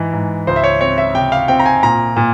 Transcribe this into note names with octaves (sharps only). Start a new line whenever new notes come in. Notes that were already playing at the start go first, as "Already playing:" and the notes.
Already playing: G#2 E3
G#2
C#2 C5
E5
C#5
C4 C#5
E5
C3 G5
F5
C4 G5
A#5
G#5
A#2 A#5
A#2